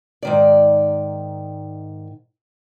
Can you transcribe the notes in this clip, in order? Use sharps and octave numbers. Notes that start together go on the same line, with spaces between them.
G#2 D#3 D5